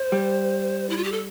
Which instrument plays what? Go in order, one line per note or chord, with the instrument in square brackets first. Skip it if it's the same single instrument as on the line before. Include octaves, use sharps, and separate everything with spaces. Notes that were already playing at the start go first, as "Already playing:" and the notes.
Already playing: [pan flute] C5
[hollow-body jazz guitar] G3
[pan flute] E4
F4
G4
A4